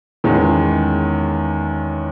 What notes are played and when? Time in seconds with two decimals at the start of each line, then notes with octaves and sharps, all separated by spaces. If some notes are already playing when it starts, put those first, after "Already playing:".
0.24 E2 D#3 G#3 C#4